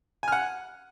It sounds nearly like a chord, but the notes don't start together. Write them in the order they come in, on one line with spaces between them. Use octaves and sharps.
G#5 F6 F#5